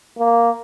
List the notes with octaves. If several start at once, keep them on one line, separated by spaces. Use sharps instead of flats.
A#3